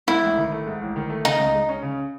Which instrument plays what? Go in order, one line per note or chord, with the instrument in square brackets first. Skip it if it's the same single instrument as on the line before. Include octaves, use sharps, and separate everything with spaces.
[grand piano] G#2 [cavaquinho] E4
[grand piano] A1
D#3
A3
G#2
A1
D#3
A3
[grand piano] C#3 [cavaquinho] D#4
[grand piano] C#2
G#3
C#4
C#3